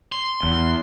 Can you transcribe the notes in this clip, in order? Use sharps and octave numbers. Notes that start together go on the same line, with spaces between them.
C6
E2